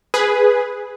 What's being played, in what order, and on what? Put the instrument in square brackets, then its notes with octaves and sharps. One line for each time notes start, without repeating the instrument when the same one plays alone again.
[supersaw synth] G#4 B4